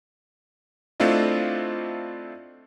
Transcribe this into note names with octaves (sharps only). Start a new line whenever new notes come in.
A3 C4 D4 E4 F4 D#5